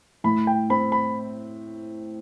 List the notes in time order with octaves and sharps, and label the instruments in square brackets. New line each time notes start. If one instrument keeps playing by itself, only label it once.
[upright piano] A2 [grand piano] B5
[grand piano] G5
[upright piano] C4 [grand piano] B5
[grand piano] B5